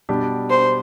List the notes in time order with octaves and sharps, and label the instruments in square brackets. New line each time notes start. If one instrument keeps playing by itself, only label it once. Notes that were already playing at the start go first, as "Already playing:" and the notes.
[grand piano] B2 G3 D4 G4
[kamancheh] C5